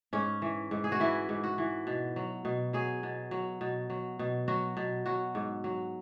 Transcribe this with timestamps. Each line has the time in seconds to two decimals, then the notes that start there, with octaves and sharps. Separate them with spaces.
0.13 G#2 C#4
0.42 E3
0.71 G#2
0.84 G#4
0.92 F#4
1.00 E3 E4
1.29 G#2
1.44 F#4
1.58 E3
1.87 B2
2.16 F#3
2.45 B2
2.73 F#3 G#4
3.03 B2
3.31 F#3
3.61 B2
3.90 F#3
4.19 B2
4.48 F#3 F#4
4.77 B2
5.06 F#3 F#4
5.35 G#2
5.64 F#3